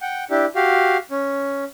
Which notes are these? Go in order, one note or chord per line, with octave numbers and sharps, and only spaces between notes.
F#5 G5
D4 E4 G4
F#4 G4 F5
C#4